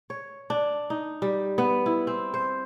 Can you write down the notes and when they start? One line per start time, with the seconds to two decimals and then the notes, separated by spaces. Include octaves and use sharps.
0.10 C#5
0.50 D4
0.90 D#4
1.22 G3
1.58 B3
1.86 E4
2.07 C4
2.34 C5